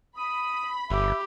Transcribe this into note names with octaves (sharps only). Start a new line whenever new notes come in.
B5 D#6
G1 G4 E5